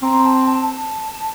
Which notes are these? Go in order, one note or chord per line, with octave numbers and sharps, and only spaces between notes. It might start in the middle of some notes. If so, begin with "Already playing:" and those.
C4 A#5
A5
A5
A5